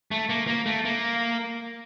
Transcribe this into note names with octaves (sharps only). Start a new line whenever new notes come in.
A3
A#3
A#3
A3
A#3